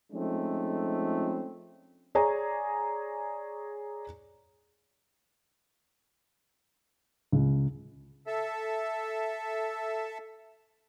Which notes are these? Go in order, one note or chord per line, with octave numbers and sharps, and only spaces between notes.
F3 G#3 A3 C4 C#4 D#4
G#4 C#5 D5 G#5 A#5
C#2
A4 E5